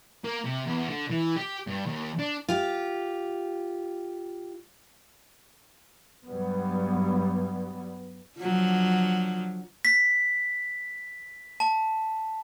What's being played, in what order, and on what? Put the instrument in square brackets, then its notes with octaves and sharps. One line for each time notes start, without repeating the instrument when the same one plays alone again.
[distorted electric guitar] A#3
C3
E2
D3
E3
G4
G2
D#2
D4
[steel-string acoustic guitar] F4 G4
[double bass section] G2 F#3 G3 B3
[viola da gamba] D3 F3 F#3
[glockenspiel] B6
A5